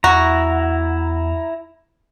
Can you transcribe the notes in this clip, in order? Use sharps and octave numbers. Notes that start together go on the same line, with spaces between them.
E2 E4 F#4 A#5